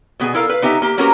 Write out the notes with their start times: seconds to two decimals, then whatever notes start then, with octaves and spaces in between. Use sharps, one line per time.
0.20 B2 B3 G#4 G#5
0.35 E4 A4 A#4 F5
0.49 B4 F5
0.62 B3 D#4 G4 E5 G#5
0.82 A#3 G4
0.98 A#3 B3 C#4 F#4 G4 A#4